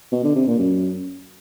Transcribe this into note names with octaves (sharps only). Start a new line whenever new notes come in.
B2
D3
C3
A#2
F#2